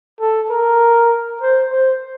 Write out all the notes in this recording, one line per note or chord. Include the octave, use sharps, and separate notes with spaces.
A4
A#4
C5
C5